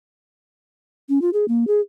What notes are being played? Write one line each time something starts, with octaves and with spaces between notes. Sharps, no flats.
C#4
F4
G#4
A#3
G#4